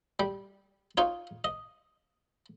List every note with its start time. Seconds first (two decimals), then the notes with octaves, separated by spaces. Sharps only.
0.20 G3
0.97 D#4 F4 C#5
1.44 D#5